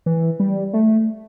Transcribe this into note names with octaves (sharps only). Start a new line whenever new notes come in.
E3
G3
A3